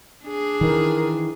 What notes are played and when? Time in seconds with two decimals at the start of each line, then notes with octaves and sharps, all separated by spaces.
0.25 D4 G#4
0.61 D#3 E3 A#4